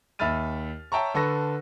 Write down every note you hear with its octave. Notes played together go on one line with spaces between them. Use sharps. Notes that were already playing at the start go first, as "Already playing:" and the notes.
D#2 E5 B5 F6 A6 D#7
C#5 E5 G5 A5 A#5 C#6
D3 A4 B4 C#6 E6 A#6